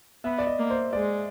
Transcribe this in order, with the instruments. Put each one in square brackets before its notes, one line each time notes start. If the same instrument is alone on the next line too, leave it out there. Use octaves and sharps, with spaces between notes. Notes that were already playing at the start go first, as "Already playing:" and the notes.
[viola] B3 [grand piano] E5
[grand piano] D5
D#5
[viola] A#3
[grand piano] C5
[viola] G#3 [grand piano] D5